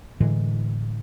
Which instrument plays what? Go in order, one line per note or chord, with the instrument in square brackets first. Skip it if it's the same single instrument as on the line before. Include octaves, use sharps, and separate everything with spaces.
[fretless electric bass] A2 D3 E3 G#3